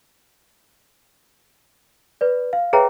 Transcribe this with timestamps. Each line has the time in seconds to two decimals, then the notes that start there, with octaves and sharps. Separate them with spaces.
2.21 B4 D5
2.53 F5
2.73 G#4 B4 C#5 E5 G5 A#5